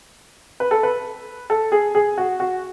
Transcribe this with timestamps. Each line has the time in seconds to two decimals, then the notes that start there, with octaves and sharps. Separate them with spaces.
0.60 B4
0.71 A4
0.83 B4
1.50 A4
1.72 G#4
1.95 G#4
2.18 F#4
2.40 F#4